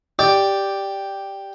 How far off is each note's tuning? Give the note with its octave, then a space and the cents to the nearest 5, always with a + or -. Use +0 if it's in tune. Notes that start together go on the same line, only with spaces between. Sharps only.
G4 +0 D5 +0